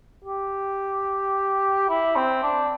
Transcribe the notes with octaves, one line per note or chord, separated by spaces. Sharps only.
G4
E4
C4
D4